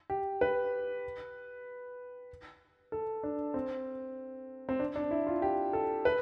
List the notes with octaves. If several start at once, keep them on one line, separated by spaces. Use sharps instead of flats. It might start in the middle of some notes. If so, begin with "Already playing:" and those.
G4
B4
A4
D4
C4
C4
D4
D4
E4
F4
G4
A4
B4